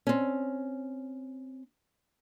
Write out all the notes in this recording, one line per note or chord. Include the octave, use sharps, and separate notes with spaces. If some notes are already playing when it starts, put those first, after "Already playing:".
C4 C#4